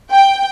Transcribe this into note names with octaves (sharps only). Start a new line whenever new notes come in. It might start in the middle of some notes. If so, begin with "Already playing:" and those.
G5